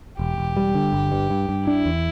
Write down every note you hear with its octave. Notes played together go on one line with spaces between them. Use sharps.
E1 G4
E1
G3
D3
G1
G2
G2
G2
D4 E4
E2